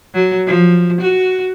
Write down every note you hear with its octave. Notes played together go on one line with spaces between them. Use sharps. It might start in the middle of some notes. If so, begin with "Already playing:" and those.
F#3
F3
F#4